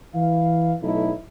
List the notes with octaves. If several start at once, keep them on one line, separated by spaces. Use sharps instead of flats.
E3 F5
B1 F#3 A3 D#4 E4